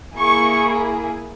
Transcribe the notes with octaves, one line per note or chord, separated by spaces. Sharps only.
A#3 E4 G#4 C#6